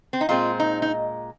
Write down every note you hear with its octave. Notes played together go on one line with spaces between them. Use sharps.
C4
D#4
A#2 G#3 C4 F4
D#4
D#4